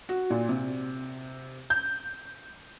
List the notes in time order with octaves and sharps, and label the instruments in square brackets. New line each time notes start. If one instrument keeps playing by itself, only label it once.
[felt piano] F#4
A#2
C3
G6